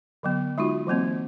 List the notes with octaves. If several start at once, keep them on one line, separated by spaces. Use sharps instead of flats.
D3 F#3 B3
G#3 D#4 F4 F#4
E3 F#3 A#3 C4